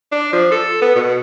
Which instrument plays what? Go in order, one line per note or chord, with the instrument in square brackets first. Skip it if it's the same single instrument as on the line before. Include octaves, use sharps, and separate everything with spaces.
[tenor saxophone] D4
F3
A4
B3
B2